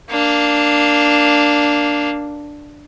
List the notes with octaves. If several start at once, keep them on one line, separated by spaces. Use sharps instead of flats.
A#3 D4